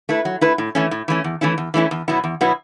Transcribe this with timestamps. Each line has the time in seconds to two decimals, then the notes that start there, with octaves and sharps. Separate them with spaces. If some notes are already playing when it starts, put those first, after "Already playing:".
0.09 A3 E4 B4
0.25 F#3
0.41 A3 E4 B4
0.58 A2
0.75 E3 A3 C#4
0.91 A2
1.08 E3 A3 C#4
1.24 E2
1.41 E3 A3 C#4 E4
1.58 E2
1.74 E3 A3 C#4 E4
1.91 E2
2.08 B2 F#3 B3 E4
2.24 E2
2.41 B2 F#3 B3 E4